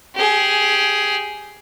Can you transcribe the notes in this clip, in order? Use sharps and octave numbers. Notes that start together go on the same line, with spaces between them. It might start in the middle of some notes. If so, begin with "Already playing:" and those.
G4 G#4